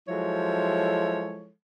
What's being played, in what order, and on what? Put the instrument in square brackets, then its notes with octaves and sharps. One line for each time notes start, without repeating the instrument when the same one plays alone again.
[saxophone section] F3 F#3 G#3 E4 A4 C#5